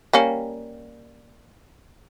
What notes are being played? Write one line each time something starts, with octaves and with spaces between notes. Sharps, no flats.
G3 A#3 C#4